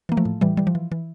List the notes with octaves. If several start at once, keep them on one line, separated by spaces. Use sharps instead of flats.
E3 A#3
F3 A3
A2
A2 E3 G3
E3 G3
F3
E3
E3